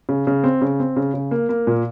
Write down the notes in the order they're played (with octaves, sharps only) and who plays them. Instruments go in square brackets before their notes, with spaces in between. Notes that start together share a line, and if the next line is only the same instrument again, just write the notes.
[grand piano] C#3
C#3
C4
C#3
C4
C#3
C#3
A#3
A#3
A#2